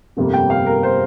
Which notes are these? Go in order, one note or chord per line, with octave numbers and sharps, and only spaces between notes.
G1 F2 C3 G3 A#3
G5
F5
A#4
C5